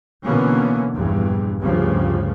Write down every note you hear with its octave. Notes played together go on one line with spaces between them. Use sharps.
B2 D3 E3 A#3 B3 C#4
A#1 E2 G2
D2 G2 C#3 F3